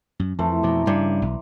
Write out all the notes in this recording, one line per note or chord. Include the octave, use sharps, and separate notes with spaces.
F#2
F2 E3 A3 C5
F2 B2 F3 D5 A#5
G2 C#3
B1